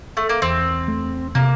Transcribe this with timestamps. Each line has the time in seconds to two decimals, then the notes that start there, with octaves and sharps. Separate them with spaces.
0.17 A3
0.29 A#3
0.42 E2 C4
0.88 A3
1.35 C3 A#3